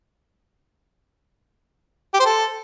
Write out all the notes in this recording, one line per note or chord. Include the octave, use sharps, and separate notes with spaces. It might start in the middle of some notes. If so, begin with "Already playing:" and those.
G4
C5
A4